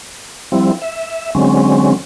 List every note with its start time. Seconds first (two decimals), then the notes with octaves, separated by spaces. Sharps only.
0.52 F3 G3 C4 E4
0.82 E5
1.35 D3 F#3 G#3 C4 C#4